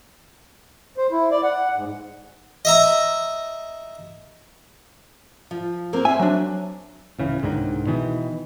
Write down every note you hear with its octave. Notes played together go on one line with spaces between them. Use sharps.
C5
E4
D5
F#5
G#2
D#5 E5 A#5
F3
A#3 C4 A#4
C5 E5 G#5
F#3 D4
D1 C#3 E3
C2 G#2 D3 D#3
B2 D#3 E3